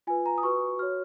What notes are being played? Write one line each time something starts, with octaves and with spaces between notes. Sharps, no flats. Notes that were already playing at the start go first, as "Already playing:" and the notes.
F4 B4 G#5
A#5
D#6
F#4 B4 C#6
F#4 C#5 F6